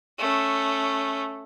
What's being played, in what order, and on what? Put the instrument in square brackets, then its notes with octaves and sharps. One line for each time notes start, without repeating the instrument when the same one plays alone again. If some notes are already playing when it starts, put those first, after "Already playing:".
[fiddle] A3 C#4